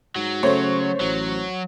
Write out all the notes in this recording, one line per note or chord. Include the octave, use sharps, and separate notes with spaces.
G#2 F#3
C#3 A3 C5 C#5
A1 F#3